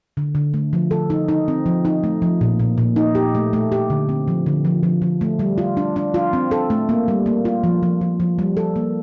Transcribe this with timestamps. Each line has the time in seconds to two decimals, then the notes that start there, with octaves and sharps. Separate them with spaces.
0.17 D3
0.35 D3
0.54 A3
0.73 F3
0.91 A4
1.10 D#4
1.28 D#4
1.48 C4
1.66 F3
1.85 D#4
2.04 A3
2.22 F3
2.41 A#2
2.60 A#2
2.78 A#2
2.96 D#4
3.15 G4
3.35 A3
3.53 A3
3.72 G4
3.90 D3
4.09 C4
4.28 F3
4.46 D3
4.65 F3
4.83 F3
5.02 F3
5.21 A3
5.39 G3
5.58 F4
5.77 D4
5.96 D4
6.14 F4
6.33 C4
6.51 A4
6.70 A3
6.89 A#3
7.08 G3
7.26 A#3
7.45 F4
7.64 F3
7.83 F3
8.01 F3
8.20 F3
8.39 G3
8.57 A4
8.76 A#3